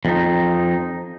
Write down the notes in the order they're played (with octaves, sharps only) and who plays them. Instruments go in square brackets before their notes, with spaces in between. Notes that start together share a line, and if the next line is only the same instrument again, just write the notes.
[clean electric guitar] F2 D#4